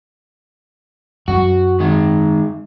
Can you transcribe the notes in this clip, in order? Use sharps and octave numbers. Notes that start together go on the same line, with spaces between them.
F#2 F#3 F#4
D#3 G#3